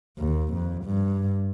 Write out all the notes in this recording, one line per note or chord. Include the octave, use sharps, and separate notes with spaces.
D#2
F2
G2